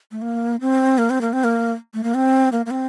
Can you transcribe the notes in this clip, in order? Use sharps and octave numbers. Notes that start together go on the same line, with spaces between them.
A3
A#3
C4
A#3
C4
A#3
C4
A#3
A3
A#3
C4
A#3
A#3
C4